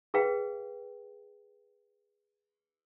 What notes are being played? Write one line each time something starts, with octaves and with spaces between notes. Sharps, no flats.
G#4 B4 F5 G5